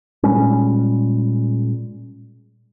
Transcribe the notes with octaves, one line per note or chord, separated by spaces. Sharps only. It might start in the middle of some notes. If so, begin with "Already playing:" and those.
A#2 G3 G#3 C#4